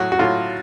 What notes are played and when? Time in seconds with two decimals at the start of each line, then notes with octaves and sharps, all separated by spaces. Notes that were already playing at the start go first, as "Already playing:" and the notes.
Already playing: A2 F#3 F#4
0.12 F#4
0.19 A2 F#3 F4